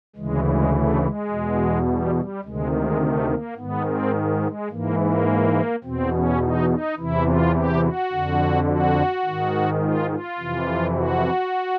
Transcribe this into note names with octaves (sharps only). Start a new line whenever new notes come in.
D2 C#3 E3 G#3
G#3
A3
G#3
E2 B2
G3
G3
D2 C3 D#3 G#3
G#3
A3
A#3
G#2 D#3 B3
C4
G#3
G#2 E3 A#3
A#3
E2 B2 C4
C#4
D#4
D#4
E2 C3 E3 E4
F4
G4
F#4
F2 D3
F#4
G#2 D#3
F4
F4
F2 C3 E3
F#4